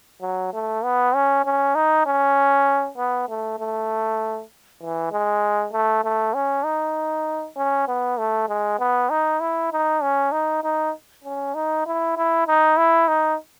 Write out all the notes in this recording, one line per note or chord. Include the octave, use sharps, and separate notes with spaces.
F#3
A3
B3
C#4
C#4
D#4
C#4
B3
A3
A3
E3
G#3
A3
A3
C#4
D#4
C#4
B3
A3
G#3
B3
D#4
E4
D#4
C#4
D#4
D#4
C#4
D#4
E4
E4
D#4
E4
D#4